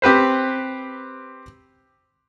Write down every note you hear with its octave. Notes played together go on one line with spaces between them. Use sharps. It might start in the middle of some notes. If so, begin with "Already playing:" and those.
C4 G4 B4 C5